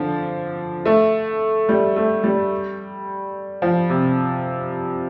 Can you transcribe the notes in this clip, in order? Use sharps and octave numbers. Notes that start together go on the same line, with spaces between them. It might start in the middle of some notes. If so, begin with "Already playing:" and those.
Already playing: D3 F3
A3
G3
A3
G3
F3
C3